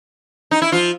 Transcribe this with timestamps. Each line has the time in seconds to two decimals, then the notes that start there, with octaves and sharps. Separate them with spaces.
0.51 D#4
0.62 E4
0.72 F3 F4